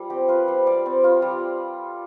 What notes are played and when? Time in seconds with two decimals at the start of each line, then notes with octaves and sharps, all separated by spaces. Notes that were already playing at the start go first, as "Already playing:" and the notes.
Already playing: G3 F4 A4
0.10 C4 G4
0.28 F4 B4
0.48 G3 C5
0.67 G3 D5
0.86 C4
1.04 F4
1.22 G3